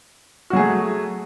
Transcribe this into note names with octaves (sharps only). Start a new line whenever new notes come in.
F#3 A3 F#4 G#4